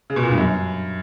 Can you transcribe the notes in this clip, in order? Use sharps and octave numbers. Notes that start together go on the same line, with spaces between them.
C#3
B2
A#2
G2
F#2